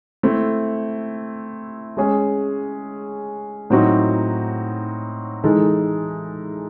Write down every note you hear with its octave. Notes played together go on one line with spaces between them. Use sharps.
A3 C4 E4
G#3 C#4 G#4
A2 F#3 C4 D#4 F#4
E3 G#3 D#4 A4